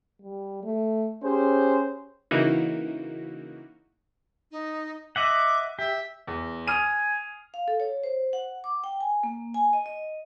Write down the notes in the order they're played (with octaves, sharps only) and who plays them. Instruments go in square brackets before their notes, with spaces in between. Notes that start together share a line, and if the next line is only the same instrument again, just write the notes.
[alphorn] G3
A3
[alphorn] C#4 [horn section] G4 G#4 C5
[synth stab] C#3 E3 A#3 D#4 E4 F#4
[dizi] D#4
[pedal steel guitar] D#5 E5 F#5 [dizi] D6
[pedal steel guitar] G4 [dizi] E5
[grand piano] E2
[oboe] G#5 [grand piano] D#6 F6 D#7
[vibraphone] F5
A4
C#5
C5
F#5
D6
G5
G#5
A#3
G#5
D#5
D#5